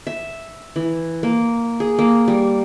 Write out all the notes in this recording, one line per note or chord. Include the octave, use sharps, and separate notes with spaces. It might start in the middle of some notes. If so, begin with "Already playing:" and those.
E5
E3
A#3
G#4
A#3
G3